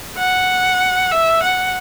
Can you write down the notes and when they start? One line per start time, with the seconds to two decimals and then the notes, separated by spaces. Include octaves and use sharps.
0.18 F#5
1.11 E5
1.43 F#5